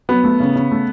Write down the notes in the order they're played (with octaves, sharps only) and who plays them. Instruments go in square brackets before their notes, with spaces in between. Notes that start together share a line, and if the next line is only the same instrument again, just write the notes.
[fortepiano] F#3 [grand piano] B3
[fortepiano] A3
C#3
C#3
A3